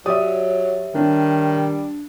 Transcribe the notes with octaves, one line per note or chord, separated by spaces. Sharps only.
F#3 G4 C#5 D5 E5 D#6
D#3 G3 D4